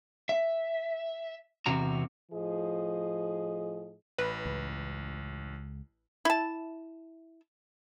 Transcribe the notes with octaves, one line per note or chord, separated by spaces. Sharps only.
E5
E2 C3 F#4 A#5
A2 F3 G#4 D#5
A1 B4
C#2
E4 A5